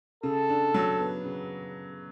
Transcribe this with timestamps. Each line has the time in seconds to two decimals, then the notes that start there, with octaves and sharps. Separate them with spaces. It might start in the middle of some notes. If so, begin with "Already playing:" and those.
0.23 C#3 A4
0.49 D4
0.74 F#3
0.99 B3
1.25 C#3